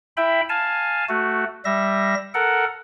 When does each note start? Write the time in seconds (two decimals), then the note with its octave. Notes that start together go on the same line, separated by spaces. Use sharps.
0.17 E4 E5 G5 B5
0.49 F5 G#5 A5
1.09 A3 F#4
1.65 G3 E5 A#6
2.34 A4 A#4 F#5